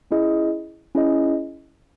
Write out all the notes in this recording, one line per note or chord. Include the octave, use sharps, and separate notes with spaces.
C#4 E4 G#4 D#5
C#4 E4 G#4 D#5